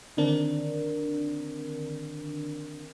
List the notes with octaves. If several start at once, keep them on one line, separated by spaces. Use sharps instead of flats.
D3 D#3 C4 D4 A#4